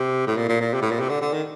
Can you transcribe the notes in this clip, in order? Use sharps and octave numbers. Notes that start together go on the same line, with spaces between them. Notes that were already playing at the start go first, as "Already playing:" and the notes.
Already playing: C3
A2
A#2
A#2
A#2
C3
A2
A#2
C3
D3
D3
D#3